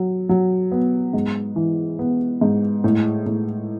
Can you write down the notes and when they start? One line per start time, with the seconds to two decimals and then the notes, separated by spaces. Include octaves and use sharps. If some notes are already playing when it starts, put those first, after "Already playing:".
Already playing: F#3
0.29 F#3
0.72 B3
1.13 G#2
1.56 E3
1.99 B3
2.41 G#2
2.84 A2
3.26 A2